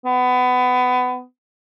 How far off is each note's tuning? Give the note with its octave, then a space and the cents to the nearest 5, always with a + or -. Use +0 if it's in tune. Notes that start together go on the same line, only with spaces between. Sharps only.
B3 +20